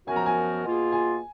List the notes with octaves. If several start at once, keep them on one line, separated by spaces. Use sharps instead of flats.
F#2 F3 B3 F#4 A#4 G#5
A#5
G#5
B2 A#3 F4 G#4
G#5